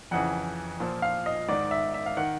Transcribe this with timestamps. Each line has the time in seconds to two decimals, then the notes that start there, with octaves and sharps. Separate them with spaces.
0.11 F2 C#3 E3 F#5
0.80 A#2 F3
1.02 F5
1.26 D#5
1.49 G#2 D#3 D5
1.71 E5
1.94 E5
2.06 F5
2.17 D#3 F#5